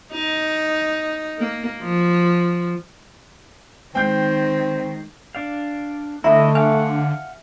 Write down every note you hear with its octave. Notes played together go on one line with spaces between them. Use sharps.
D#4
A#3
F3
D#3 G#3 C4 G5 G6 C7
D4 D5 F5
D3 A3 E4 D#5 E5 A#5
F5 F#5 G#5